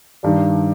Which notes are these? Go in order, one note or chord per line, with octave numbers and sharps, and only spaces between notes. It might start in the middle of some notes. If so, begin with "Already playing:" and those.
G2 D#3 G3 D4